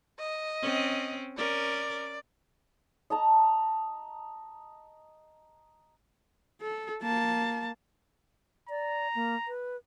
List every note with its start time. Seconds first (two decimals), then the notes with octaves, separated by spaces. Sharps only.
0.19 D#5
0.62 C4 C#4
1.38 C#4 A#4 D5
3.10 D#5 A5 A#5
6.62 A4
7.02 A#3 A5
8.70 D5 A#5
9.15 A#3
9.48 B4